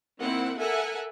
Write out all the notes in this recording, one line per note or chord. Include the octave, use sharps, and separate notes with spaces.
D#3 A#3 C4 E4 F#5
A4 A#4 E5 F#5 G#5